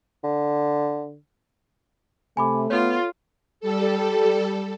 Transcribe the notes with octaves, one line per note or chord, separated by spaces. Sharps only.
D3
C3 A3 G#5 B5 D6
B3 F4 A4 C#5
G3 A4